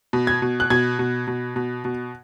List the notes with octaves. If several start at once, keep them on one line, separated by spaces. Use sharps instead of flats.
B2
G#6
B2
F#6
B2 G#6
B2
B2
B2
B2